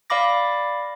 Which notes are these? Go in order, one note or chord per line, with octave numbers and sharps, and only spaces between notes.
D5 F5 B5 D6 A#6